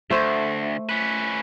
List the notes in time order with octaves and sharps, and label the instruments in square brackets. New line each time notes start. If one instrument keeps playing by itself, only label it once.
[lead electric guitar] D2 [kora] A3 C5
[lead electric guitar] C#4 B4